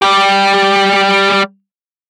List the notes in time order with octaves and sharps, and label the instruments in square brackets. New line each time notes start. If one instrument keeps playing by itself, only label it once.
[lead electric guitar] G3 G4